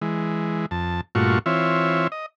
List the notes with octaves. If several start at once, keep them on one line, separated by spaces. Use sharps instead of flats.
E3 G#3
F2 A5
G2 A#2 A3 F4 F#4 C#6
E3 C4 F4 C#5 E5
D#5